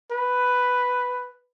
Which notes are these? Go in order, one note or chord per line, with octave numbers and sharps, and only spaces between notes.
B4